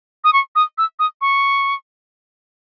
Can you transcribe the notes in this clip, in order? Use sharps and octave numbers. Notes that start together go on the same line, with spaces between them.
D#6
C#6
D#6
E6
D#6
C#6